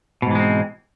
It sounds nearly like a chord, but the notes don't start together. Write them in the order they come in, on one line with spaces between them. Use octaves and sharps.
B2 G#2 E3 G#3 C4